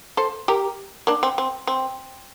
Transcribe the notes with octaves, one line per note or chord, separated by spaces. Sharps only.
A4 C5
G4 A#4
A#3 D4
C4
C4
C4